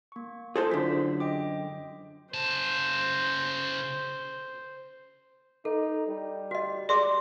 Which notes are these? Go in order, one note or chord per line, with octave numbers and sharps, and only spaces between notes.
A#3 C#6
E4 F4 G#4 A4 C5
F#2 D3 C5 B6
D#5 G5 D6
C#3 C5 A5
D#4 A4
G3
F#4 D#5
G#4 D5 C6 D6